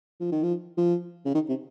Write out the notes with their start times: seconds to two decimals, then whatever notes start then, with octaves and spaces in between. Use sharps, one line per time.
0.20 F3
0.32 D#3
0.43 F3
0.77 F3
1.25 C#3
1.35 D#3
1.49 C3